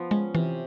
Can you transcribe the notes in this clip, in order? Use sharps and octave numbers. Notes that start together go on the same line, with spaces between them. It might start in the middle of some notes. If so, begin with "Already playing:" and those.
Already playing: F3 B3
G#3 C#4
C3 E3